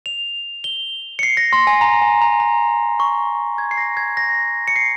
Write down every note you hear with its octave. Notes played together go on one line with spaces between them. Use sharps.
F7
G7
C#7
C7
A#6
C6
G#5
A#5
G#5
A#5
A#5
C#6
G#6
C7
A#6
G#6
A#6
C#7
C7